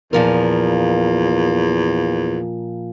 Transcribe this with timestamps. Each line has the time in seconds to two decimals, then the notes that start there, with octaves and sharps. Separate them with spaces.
0.13 E2 A#2 F3 A#4